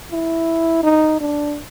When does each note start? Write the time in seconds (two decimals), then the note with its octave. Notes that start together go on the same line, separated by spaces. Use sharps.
0.12 E4
0.83 D#4
1.20 D4